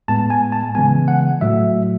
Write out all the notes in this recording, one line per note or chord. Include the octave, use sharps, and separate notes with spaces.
A2 G#3 B3 A5
G#5
A5
C#3 E3 G#3 B3 G#5
F#5
A2 F#3 A3 E5